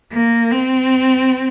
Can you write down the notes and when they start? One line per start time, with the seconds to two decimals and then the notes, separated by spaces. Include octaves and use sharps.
0.13 A#3
0.51 C4